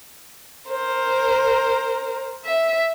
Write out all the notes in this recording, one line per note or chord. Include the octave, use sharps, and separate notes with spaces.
A#4 C5
E5